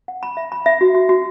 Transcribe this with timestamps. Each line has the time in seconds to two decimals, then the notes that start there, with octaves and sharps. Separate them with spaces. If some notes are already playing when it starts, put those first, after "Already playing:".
0.08 F#5
0.23 B5
0.37 E5
0.52 B5
0.66 E5
0.81 F#4
0.95 F#4
1.09 F#4